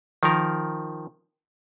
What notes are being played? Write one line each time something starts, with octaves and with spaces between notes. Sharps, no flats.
D#3 F3 A#4